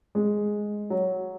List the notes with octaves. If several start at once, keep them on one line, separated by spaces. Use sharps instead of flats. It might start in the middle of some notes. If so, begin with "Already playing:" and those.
G#3
F#3